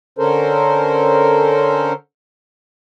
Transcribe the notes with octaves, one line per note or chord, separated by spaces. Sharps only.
D3 C#4 A4 A#4 C5